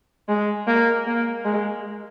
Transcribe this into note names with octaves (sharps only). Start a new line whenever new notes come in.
G#3
A#3
A#3
G#3